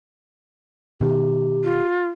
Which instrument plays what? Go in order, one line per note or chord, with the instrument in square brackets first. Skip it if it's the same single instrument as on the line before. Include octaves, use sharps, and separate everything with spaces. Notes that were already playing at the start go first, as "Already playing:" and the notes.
[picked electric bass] B2 D#3 [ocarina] G4
[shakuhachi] F4